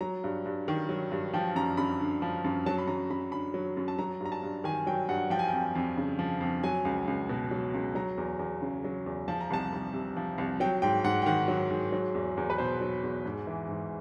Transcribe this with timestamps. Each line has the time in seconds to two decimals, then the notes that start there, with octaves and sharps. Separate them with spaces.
0.01 F#3 A#5
0.24 G2
0.46 G2
0.68 D#3
0.89 F#3
1.12 G2
1.33 F3 G5
1.56 F#2 A#5
1.77 F#2 B5
2.00 D3
2.22 F3
2.44 F#2
2.66 F#3 A5
2.78 B5
2.87 F#2 A#5
3.10 F#2 B5
3.32 D3 B5
3.54 F#3
3.77 F#2
3.88 A5
3.99 F#3 A#5
4.20 G2
4.25 A#5
4.32 A5
4.43 G2
4.64 D#3 G#5
4.87 F#3 G5
5.08 G2 F#5
5.30 F3 G5
5.39 G#5
5.48 F2 G5
5.75 F2
5.97 C#3
6.19 F3
6.41 F2
6.63 F#3 G#5
6.85 C#2
7.08 C#2
7.29 B2
7.51 F#3
7.74 C#2
7.95 F#3 A#5
8.18 E2
8.39 E2
8.62 C#3
8.84 F#3
9.06 E2
9.28 F3 A5
9.41 A#5
9.50 C2 A5
9.72 C2
9.94 C3
10.16 F3
10.38 C2
10.60 F#3 G5
10.82 G#2 G5
11.04 G#2 F#5
11.22 G5
11.26 D#3 F#5
11.48 F#3
11.71 G#2
11.92 F#3
12.15 E2
12.37 E2
12.50 B4
12.58 B2 C5
12.81 F#3
13.03 E2
13.26 G#2
13.47 E3
13.69 G#2